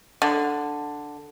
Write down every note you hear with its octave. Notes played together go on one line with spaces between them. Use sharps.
D3